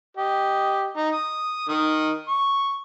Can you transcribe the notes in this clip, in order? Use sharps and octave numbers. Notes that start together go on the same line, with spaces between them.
G4 D#5
D#4
D#6
D#3 D#6
C#6